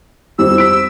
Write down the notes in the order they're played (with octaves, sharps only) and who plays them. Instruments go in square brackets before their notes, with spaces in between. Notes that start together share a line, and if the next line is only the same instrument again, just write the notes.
[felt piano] F2 G3 [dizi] E6
[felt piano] B6 D7